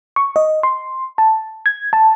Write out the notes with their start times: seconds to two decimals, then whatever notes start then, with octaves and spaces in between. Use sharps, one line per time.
0.16 C#6
0.36 D#5
0.63 C6
1.18 A5
1.66 G#6
1.93 A5